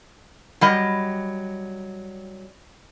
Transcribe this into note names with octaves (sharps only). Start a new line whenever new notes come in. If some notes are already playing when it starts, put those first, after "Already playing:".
F#3 G3 D#5